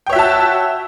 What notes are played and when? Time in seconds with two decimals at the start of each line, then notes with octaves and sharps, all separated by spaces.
0.06 G5
0.10 C#5
0.13 E5
0.16 F#4
0.19 A5